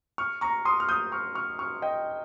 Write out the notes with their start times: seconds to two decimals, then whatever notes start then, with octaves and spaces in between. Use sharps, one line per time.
0.18 C#6 F6
0.41 A#5 C#6
0.65 C6 D#6
0.80 F6
0.89 D#6 G6
1.12 C#6 F6
1.35 C#6 F6
1.59 C#6 F6
1.82 D#5 G5